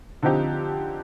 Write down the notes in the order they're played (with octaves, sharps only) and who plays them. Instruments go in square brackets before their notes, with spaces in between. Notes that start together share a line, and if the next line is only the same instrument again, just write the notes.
[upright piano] D3 F3 C4 D#4 G4